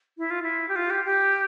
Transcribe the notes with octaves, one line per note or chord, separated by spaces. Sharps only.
E4
F4
E4
G4
F4
G4
G4